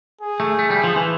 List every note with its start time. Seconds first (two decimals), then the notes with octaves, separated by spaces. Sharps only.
0.21 G#4
0.40 A3
0.59 A3
0.71 G3
0.84 F3
0.96 E3